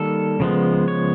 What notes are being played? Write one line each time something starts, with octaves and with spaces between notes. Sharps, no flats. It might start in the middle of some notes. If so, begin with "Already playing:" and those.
Already playing: D#3 G3 A#3 A4
C#3 F3 G#3 B3
C#5